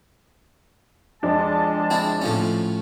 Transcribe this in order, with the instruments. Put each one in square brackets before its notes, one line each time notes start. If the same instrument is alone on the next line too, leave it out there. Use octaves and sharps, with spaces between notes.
[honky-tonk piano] F2 D4 [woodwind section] G#3 A5
[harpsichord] C4 E4
A2 F3 C#4